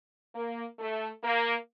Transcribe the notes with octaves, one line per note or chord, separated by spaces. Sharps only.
A#3
A3
A#3